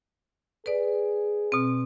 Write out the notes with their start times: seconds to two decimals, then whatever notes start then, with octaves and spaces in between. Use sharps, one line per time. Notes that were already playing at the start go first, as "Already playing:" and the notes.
0.66 G#4 B4 D5
1.52 B2 C4